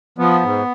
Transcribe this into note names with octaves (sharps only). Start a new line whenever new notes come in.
F3 B3
G#2